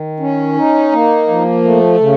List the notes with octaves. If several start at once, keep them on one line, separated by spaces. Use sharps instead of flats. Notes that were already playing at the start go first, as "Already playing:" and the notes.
Already playing: D#3
C#4
D#4
A#3
F3
A3
C#3